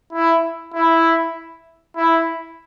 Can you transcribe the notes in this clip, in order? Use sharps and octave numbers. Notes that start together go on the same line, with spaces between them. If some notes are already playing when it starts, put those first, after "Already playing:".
E4
E4
E4